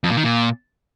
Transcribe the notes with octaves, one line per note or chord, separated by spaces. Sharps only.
F2
A#2
D#3
A#2